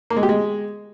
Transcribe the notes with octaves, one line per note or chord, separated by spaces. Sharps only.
A#3
G#3
G4
G#3